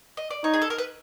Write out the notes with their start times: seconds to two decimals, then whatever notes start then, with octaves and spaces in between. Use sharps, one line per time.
0.17 D#5
0.30 D5
0.44 D#4 C#5
0.54 G#4
0.62 A4
0.70 A#4
0.78 B4